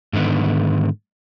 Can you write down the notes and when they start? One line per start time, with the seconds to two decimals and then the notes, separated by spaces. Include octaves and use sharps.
0.13 G#2 D3 D#3 B3